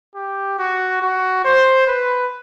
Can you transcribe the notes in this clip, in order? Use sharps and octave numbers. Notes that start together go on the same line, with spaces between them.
G4
F#4
F#4
C5
B4